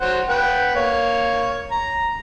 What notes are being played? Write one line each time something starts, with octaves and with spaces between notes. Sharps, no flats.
F#3 C5 F#5
B4 F#5 G5
A#3 C#5
A#5